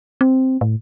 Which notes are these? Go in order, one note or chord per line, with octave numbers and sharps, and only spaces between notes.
C4
A2